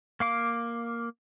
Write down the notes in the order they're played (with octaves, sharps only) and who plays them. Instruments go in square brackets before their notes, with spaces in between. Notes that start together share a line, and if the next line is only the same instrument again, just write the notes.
[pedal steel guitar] A#3 F5 D6